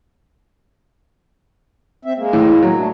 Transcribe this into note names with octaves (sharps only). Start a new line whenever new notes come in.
C4 E5
G#3 A#3
A2 E3
F#3
A3 D4